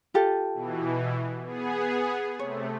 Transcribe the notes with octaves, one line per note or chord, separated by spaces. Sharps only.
F4 G4 A4
B2 E3
B3 G#4
C3 A3 C#5